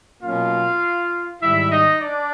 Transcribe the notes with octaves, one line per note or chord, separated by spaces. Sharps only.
B2 F#3 A#3 C#4 F4 F5
G#2 D#3 G3 E4 E5
D#4 D#5
D4 D5